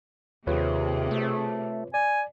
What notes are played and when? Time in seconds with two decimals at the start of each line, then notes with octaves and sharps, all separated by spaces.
0.47 D#2 C3 F4 G#4 B4 C#5
1.11 A3
1.94 D5 G#5